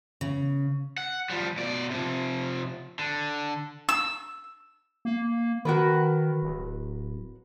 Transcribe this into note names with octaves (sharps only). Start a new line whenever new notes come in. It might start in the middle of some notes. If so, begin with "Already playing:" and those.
C#3
F#5
F3 G3
B2 D5
C3 F3
D3
E6
A#3
D#3 F#4 A#4 B4
D1